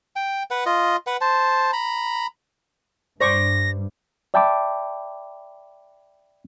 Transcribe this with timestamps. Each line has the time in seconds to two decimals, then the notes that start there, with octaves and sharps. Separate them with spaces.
0.16 G5
0.51 B4 F#5
0.66 F4 D#5
1.07 B4 F#5
1.21 C5 A5
1.73 A#5 B5
3.21 G2 C5 D5 C#6 A#6
4.34 D5 E5 G5 A5 B5 D6